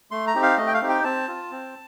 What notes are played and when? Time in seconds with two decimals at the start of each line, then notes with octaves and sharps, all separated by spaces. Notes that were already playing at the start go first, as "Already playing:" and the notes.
0.11 A3 C6
0.27 A#5
0.34 C4 D#4 G4
0.43 F5
0.58 A3 D#5
0.67 G5
0.74 F5
0.81 C4 D#4 G4
0.89 G5
1.04 C4 A5
1.28 F4
1.51 C4